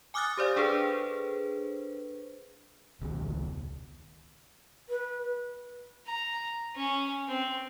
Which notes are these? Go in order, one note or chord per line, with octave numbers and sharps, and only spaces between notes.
G#5 D6 D#6 F6 F#6 A6
G4 C5 D5 F5
D4 G#4 A4 B4 C5
E1 C#2 B2 D#3
B4
A#5
C#4
C4